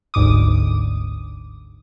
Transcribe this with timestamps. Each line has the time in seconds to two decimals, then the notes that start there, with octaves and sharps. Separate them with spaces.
0.14 G1 D2 G#2 D6 D#6